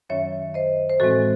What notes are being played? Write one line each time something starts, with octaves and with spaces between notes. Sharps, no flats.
F#2 D#3 F#3 C#4 C#5 E5
C5 D#5
C5
A2 E3 G#3 C4 F#4 A4